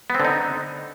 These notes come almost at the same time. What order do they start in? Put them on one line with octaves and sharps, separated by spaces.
B3 C4 D3 D#4